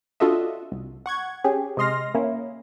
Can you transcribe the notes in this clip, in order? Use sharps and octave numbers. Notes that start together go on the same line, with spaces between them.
D4 F4 F#4 A4 D#5 E5
C2
F#5 C#6 G#6
C#4 G4 G#4
C3 G#3 D#5 C6 F6 A#6
A#3 C#4 E4